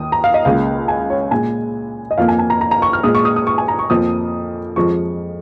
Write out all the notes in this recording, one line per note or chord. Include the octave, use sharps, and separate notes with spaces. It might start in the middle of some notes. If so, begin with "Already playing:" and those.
Already playing: D#2 D#3 A#3 D#6
A#5
F5
D#5
C#2 C#3 A#3 F5
G#5
C#5
A#2 G#3 G#5
D#5
F2 F3 A#3 F5
G#5
G#5
A#5
A#5
A#5
C#6
F6
A#2 G#3 D#6
C#6
D#6
D#6
C#6
G#5
A#5
C#6
F2 F3 A#3 D#6
F2 F3 G#3 C#6